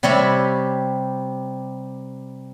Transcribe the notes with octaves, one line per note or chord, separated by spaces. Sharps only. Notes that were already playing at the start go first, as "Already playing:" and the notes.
C3 G3 G4 C#5 E5 B5